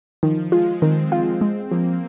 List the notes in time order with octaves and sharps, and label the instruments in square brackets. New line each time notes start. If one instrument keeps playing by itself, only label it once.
[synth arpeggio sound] D#3 [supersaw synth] F3
[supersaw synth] G#3 [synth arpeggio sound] F4
[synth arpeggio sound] D#3 [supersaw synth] C4
[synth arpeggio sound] F4
[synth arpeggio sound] G#3 [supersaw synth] C4
[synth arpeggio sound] F3 [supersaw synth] A#3